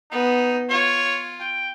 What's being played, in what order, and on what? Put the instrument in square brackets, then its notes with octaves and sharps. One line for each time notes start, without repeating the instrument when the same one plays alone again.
[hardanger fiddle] B3 [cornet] D#4
[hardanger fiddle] F4 [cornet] C#5
[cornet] G5